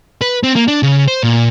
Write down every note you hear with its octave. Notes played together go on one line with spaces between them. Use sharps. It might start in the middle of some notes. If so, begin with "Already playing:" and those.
B4
C4
A#3
D4
C#3
C5
A#2